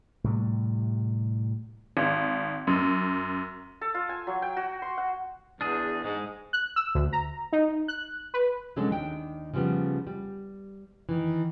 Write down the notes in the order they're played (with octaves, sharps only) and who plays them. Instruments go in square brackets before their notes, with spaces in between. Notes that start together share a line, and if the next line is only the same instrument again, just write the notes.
[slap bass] A2 C3 G3
[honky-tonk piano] G#1
F#2
[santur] A4
F4
G#5
F#3
G5
F#4
C6
F#5
[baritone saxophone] E2 [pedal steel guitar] D4 G#4
[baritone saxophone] G#2 [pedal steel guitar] G#3
[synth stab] F#6
E6
D2
A#5
D#4
F#6
B4
[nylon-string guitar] C3 F#3 G#3 C#4 D4 A4
D#2 D#3 D4 G5
C#3 F3 G3 B3
G3
D#3 E3